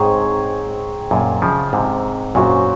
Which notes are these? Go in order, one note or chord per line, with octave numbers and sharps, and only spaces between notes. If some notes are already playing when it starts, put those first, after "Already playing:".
Already playing: G#2 C4 D#4 G#4 C#5
F#2 A#2
C#3 F3
G#2 C3
F#2 A#2 C#4 F#4 C5